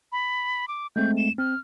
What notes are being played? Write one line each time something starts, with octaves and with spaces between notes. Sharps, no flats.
B5
D6
G#3 A3 C4 G6
E7
C4 F6